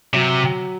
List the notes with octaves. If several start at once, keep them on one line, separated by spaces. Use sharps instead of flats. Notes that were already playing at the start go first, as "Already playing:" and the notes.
C3 F#3